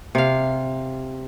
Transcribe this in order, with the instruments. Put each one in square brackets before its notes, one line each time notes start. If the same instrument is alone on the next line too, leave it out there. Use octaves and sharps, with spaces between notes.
[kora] C3 F5